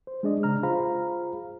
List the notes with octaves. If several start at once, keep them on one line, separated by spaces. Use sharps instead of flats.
C5
G#3 D4 G#4 D5 D#5
C#3 A#5 F6
F4 G#4 C5 F5 A#5 B5